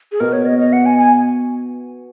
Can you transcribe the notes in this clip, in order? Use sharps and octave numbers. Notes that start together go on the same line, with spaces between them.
G#4
B2 A#4
C#5
D#5
D#5
F#5
G#5
G#5